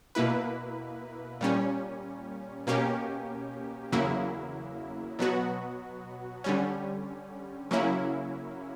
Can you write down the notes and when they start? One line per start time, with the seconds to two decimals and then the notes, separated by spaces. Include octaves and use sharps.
0.15 B2 A#3 E4 B4
1.41 A#2 G3 C#4
2.67 B2 A#3 C#4 G4
3.92 E2 C#3 F#3 A#3 E4
5.19 B2 F#3 B3 F#4
6.44 D3 G3 C#4
7.71 C#3 F#3 A#3 C#4 E4